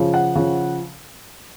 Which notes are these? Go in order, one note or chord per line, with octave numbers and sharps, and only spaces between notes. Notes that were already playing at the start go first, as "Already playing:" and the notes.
Already playing: C#3 F3
F#5
C#3 F3